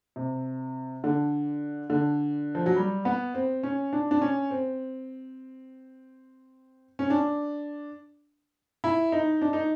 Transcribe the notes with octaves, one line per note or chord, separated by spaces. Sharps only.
C3
D3
D3
F3
F#3
G3
B3
C4
C#4
D4
D4
C#4
C4
C#4
D4
E4
D#4
D4
D#4